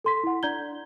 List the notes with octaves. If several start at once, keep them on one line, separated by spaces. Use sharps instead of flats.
A4 C6 B6
E4 F#5
D4 D5 A#5 G6 G#6 G7